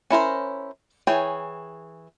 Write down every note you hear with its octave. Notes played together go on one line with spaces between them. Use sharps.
C#4 E4 A#4 C5
E3 G#4 C#5 G5